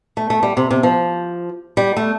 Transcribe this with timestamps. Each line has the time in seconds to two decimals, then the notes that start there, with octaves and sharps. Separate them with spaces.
0.17 A3
0.30 A3
0.43 G3
0.57 C3
0.71 C3
0.83 F3
1.77 G3
1.97 A3